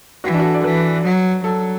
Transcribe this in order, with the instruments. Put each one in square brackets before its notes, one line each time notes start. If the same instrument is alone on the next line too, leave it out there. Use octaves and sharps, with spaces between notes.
[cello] E3 [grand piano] F#4
[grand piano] D4
F#4
A4
D5
A4
[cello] E3 [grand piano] B4
[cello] F#3
[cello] F#3 [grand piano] A4